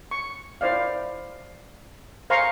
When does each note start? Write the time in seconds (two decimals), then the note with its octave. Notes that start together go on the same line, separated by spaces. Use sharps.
0.11 C#6
0.61 E4 C5 D5 F5
2.30 C5 F5 G#5 A#5 C6 C#6